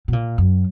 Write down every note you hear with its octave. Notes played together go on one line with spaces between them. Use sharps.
B2
A#2
F#2